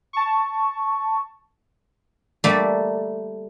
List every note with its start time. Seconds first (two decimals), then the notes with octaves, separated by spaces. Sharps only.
0.13 A5 C#6
2.44 G3 A3 A#3 A4